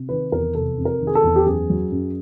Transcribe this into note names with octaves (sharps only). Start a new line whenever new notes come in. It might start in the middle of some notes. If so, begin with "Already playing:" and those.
Already playing: C3
D#3 B4
E2 A#4
F1 A4
C3
A#4
D#3
G#4
A4
E2
G4
F#2 G#4
F#3
F#2